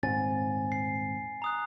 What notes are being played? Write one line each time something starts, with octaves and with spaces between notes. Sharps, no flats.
D#1 G#2 C4 G#5 A6
C7
A#5 D#6 F#6